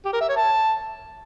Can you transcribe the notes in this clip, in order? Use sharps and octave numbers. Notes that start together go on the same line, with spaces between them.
G4
A#4
E5
C#5
A5